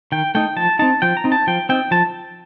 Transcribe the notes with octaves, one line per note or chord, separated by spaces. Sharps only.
D#3 G5
A3 D#4 G5
F3 A5
C4 D#4 A5
F3 G5
A#5
C4 D#4
A5
F3 G5
C4 D#4 G5
F3 A5